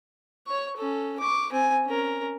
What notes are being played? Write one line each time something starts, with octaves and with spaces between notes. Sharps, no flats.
C#5 C#6
C#4 A4
C#6 D6
C4 G#5
C#4 A#4